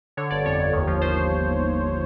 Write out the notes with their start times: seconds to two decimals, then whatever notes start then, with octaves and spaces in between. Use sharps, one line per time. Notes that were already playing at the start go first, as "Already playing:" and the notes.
0.17 D3 C#5
0.30 G1 D5
0.45 F2 C#5
0.59 G1
0.73 D#2
0.87 F3
1.01 F3 C5